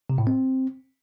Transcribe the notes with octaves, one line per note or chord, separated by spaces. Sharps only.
C3
A2
C4